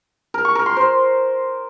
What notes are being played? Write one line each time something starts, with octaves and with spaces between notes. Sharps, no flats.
A#4
C#6
A#4
C6
C5